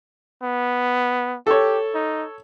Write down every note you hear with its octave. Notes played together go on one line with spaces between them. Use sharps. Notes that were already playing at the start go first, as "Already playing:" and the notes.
B3
G4 A4 C#5
D#4